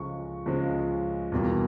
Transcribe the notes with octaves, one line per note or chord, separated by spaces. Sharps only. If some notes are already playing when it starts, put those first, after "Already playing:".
Already playing: C#2 C#3 F3 G#3 C#6
C#2 C#3 F3 G#3
E2 B2 G3 A#3